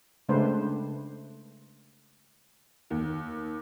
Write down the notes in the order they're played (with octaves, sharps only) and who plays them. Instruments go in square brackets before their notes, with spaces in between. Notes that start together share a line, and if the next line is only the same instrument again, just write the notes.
[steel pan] C#3 G#3 A3 D4 B4 C5
[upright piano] D#2